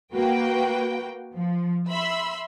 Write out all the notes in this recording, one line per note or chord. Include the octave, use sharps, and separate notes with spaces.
A#3 F#4 B4 G5
F3
E5 B5 C6 E6